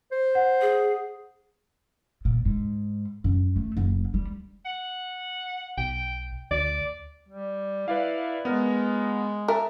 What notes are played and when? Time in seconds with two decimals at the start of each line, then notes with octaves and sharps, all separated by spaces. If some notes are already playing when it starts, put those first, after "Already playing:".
0.12 C5
0.35 F#5
0.61 G#4
2.25 A#2
2.46 G#2
3.24 F#2
3.56 A3
3.77 F#1
4.14 G3
4.65 F#5
5.78 B1 G5
6.51 D2 D5
7.28 G3
7.88 E4 B4 D5 F5
8.45 G#3 B3 A#4
9.48 A#4 E5 A5